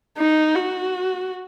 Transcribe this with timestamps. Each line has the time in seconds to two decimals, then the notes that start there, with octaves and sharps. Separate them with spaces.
0.18 D#4
0.55 F#4